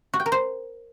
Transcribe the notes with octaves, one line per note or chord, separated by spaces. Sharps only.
F#4
G5
A#4
C5